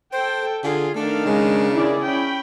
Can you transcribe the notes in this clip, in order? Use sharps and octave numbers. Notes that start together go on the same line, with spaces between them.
A4 C5 G5
D3 F4 G#4
D#3 A3 D4 F5
C#3 G#3
D#3 E4 G#4 D5
C#4 G5 B5